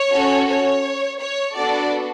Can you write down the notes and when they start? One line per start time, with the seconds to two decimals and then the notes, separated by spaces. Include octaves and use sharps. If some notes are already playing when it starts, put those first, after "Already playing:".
Already playing: C#5
0.11 C#4 F#4 A4
0.47 C#5
1.19 C#5
1.55 B3 D4 F#4 A4 D5